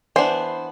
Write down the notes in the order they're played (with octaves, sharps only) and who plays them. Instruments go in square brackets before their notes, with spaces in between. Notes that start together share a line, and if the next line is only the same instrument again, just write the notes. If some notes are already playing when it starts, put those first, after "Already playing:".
[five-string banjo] E3 B3 D4 C5